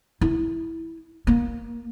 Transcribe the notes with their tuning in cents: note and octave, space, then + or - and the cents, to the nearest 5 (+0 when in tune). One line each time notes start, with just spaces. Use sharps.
E4 -10
A#3 +20